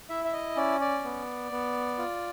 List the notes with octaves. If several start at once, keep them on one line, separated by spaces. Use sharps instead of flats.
E4 E5
E5
D#5
C#4 D5
D5
B3
B3
F4